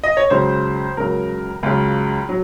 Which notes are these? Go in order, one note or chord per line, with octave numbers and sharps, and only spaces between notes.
D#5
C#5
C#2 C#3 F#3 C5
C#2 C#3 F#3 A#4
C#2 C#3 F#3 F4
F#3